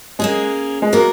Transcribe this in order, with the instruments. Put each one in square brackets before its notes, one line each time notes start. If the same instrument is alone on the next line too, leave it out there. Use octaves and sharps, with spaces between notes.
[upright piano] G#3 [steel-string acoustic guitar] A#3 C#4 G#4
[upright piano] G#3
[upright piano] A#3 [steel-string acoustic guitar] B3 F#4 A#4